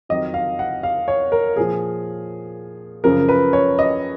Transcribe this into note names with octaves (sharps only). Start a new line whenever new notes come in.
F2 D#3 F#3 D#5
F5
F#5
F5
C#5
A#4
A#2 F3 G#4
F#2 C#3 F3 A#4
B4
C#5
D#5